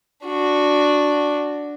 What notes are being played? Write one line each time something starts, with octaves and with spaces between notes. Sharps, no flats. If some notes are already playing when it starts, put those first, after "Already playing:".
D4 F#4